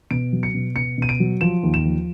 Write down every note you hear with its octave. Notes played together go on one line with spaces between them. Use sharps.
B2 D7
F#3
C#7
B2
B2 C#7
B2 D#7
D7
F#3
F3 E7
D#2
E7
F3